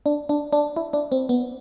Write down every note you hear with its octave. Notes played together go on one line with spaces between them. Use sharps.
D4
D4
D4
E4
D4
C4
B3